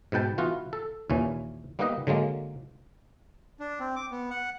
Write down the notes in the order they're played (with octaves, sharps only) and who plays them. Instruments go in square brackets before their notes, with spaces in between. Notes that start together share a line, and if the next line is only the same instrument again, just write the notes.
[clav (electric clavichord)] G#2 B2 B4 G5 A5
E3 B3 F4 F#4
A4
D#2 A#2 E3 C#4
G3 A#3 B3 D#4 B4 D#5
D3 F#3 G#3 A#3
[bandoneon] D4
C4
D6
B3
F#5